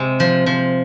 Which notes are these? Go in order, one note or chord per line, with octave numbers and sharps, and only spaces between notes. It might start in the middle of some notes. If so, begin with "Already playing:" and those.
Already playing: C3 G#3
F3
F3